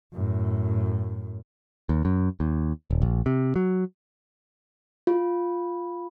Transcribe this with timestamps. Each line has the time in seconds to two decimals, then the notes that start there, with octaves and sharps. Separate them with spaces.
0.14 F#2 A2
1.89 D#2
2.05 F#2
2.40 D#2
2.91 D#1
3.02 A#1
3.26 C3
3.56 F#3
5.07 F4